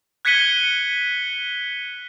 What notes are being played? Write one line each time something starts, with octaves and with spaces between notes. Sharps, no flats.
F#6 G#6 B6 C#7 D#7 G7